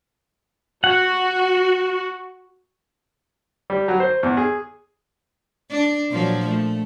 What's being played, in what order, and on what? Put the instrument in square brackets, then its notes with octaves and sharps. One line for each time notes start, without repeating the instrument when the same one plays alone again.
[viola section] F#4 [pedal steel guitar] F#5
[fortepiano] G3
F#3
C5
E2
G#4
[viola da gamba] D4
A#2 F3 F#3
A3